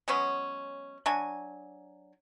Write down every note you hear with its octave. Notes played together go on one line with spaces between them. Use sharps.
F#3 G#3 B3 C#4
F#3 D4 G#5